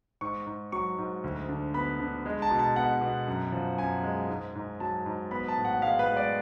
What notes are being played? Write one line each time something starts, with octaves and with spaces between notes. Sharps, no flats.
G#2 C#6
G#2
F#3 C#6
G#2
D2
D3
B3 B5
D3
G#3
A5
B2
A5
B3 F#5
B2
F#2
F3
F#2 G#5
G#3
G#2
G#2
F#3 A5
G#2
B3 B5
A5
A2
F#5
G#3 F5
B4
G#3
D5